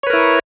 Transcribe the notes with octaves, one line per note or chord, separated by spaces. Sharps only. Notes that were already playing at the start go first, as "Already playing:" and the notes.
E4 A#4 B4 C#5